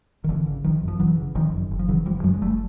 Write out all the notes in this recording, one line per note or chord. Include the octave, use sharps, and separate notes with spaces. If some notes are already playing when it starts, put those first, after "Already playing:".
D#3
G#1 D3 E3
C#3
G#1 D#3 F3
F#2
F3
G#1 E3 F#3
C#3
G#1 D#3 F3
F#2
F#1
F3
C#3 E3 F#3
F#1 F3 G3
F#2 F#3 G#3
G#3
F#1 G3 A3